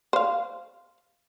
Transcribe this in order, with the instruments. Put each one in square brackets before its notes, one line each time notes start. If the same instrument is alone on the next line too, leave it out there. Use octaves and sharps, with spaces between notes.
[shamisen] C5 F5